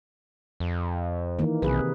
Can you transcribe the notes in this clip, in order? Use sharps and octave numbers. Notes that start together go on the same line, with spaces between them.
F2
D#3 E3 A#3
B1 C3 G#4 B4